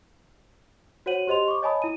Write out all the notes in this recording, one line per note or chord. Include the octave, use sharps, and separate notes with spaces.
F#4 C5 C#5 F#5 D#7 F#7
G4 C5 D#5 C6 F7
C#6 D6
C#5 D#5 G#5 A5 B5 D#6
E4 D#7